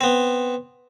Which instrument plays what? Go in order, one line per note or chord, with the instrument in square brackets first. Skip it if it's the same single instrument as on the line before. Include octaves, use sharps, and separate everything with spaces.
[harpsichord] B3 C4